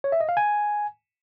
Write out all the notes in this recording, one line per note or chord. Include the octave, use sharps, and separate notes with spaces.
C#5
E5
D#5
F5
G#5